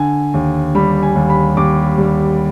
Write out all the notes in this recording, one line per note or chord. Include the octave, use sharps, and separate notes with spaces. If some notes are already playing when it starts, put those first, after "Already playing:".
Already playing: D3 G#5
D#2
G3 B5
G#5
D#2
B5
D#2 D6
G3